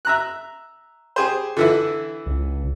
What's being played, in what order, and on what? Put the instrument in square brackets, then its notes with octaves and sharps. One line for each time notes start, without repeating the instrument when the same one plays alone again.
[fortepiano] E5 A#5 F#6
G4 G#4 C5
D3 E3 E4
[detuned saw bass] C#2